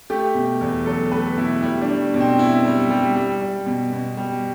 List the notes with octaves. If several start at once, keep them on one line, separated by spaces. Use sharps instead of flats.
A3 G4
B2
E2
F#3 A4
A3 B4
B2 E4
G3 E4
D4
G3
B2
C4
B2 E4
G3
G3
G3
G3
B2
B2
G3